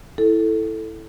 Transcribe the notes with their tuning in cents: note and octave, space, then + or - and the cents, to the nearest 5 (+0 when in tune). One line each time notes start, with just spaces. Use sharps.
E4 +0 A4 +0